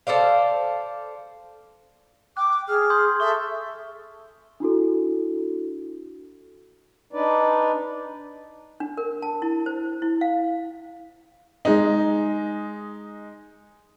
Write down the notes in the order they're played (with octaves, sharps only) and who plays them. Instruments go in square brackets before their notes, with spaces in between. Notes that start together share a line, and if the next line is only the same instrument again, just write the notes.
[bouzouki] A4 C5 D5 F5
[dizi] G5 [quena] D6 [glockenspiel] F#6
[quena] G#4 [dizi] F6
[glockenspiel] C6 D#6 G6
[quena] A4 [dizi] E5 [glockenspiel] C#6
[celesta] D4 E4 F#4 A4
[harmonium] D4 D#4 B4 D5
[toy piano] D4
A#4
A5
E4
C5
E4
F5
[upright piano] G#3 D#4